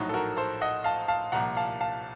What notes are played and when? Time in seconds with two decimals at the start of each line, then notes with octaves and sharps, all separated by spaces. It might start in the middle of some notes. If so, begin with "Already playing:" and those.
Already playing: A#1 A2 F#3 D#4 F#4
0.09 A4
0.14 F#4 A#4
0.37 A4 C5
0.61 D#5 F#5
0.84 F5 A5
1.08 F5 A5
1.32 C2 A#2 F3 F#5 A#5
1.57 F5 A5
1.80 F5 A5